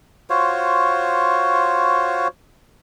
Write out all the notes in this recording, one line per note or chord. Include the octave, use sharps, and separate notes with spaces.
F4 F#4 C5 C#5